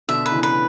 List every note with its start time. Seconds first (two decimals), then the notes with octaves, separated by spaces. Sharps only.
0.08 B2 D3 E5
0.26 B4
0.32 C#3 E3
0.43 B4